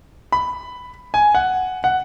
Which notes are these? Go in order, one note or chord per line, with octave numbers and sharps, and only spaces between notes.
B5
G#5
F#5
F#5